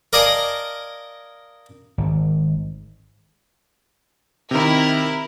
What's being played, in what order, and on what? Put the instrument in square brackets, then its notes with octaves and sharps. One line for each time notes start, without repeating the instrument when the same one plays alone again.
[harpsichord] A#4 D5 D#5 F5 G#5 A5
[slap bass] G#1
[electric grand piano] C3 D#3 [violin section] E4 A#4